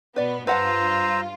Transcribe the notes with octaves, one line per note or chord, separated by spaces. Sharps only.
B2 B3 B4 D5
G2 F4 B4 C5 F#5 A5 A#5 E6